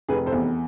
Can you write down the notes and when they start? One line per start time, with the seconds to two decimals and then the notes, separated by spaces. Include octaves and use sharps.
0.09 F1 G#4 B4
0.26 A4 C5
0.32 E2